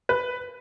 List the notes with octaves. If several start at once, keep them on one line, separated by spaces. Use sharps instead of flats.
B4